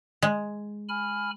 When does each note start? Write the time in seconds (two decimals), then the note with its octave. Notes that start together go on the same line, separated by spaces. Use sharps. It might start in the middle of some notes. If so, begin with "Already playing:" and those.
0.22 G#3
0.89 G#5 B5 F6